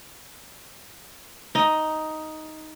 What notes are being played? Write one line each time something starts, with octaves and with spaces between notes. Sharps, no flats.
D#4 D#5